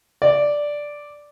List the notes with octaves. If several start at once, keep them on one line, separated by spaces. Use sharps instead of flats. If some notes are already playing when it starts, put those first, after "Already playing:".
D5